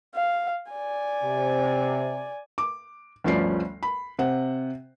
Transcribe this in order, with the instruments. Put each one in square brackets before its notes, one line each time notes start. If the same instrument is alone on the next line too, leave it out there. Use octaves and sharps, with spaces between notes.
[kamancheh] F5
D5 G#5
[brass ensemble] C3
[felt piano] D6
G1 D2 F3 C#4 D5 C7
B5
C3 C5 F#5